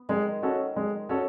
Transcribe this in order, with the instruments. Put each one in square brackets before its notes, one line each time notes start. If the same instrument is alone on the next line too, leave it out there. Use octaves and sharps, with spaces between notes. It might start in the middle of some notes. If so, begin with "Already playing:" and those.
Already playing: [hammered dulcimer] B3
[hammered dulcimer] D#3 [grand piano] G#3
[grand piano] C#4 F#4 A4
G#3
C#4 F#4 A4